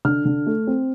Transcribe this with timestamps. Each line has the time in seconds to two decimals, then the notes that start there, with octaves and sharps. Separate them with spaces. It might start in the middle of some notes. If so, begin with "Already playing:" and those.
0.05 D3 F6
0.25 D3
0.47 A3
0.67 C4